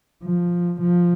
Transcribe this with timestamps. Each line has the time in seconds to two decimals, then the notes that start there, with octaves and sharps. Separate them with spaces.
0.23 F3
0.81 F3